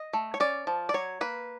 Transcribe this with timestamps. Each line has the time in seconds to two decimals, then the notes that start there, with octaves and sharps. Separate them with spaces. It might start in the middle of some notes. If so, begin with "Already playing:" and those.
Already playing: D#5
0.13 A3
0.34 C#5
0.40 C#4 D5
0.67 F3
0.89 D5
0.94 F#3 C#5
1.21 A#3 B4